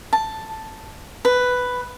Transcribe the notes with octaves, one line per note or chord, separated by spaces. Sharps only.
A5
B4